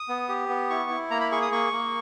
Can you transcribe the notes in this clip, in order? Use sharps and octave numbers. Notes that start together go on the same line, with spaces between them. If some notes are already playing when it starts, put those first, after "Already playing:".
Already playing: D#6
B3
G4
B3
E4 C#6
E4
A#3 A#5
B5
G#4 C#6
D#6
A#3 C#6
A#3